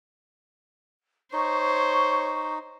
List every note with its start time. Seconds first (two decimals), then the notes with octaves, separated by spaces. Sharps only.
1.33 D#4 C5 C#5 C#6